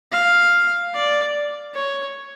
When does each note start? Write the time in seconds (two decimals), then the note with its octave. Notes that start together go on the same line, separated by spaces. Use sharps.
0.12 F5
0.94 D5
1.75 C#5